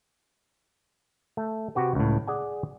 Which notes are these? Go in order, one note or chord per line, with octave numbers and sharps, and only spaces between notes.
A3
C3 F#4 G4 B4
C#2 A2
G#4 D5 F#5 G#5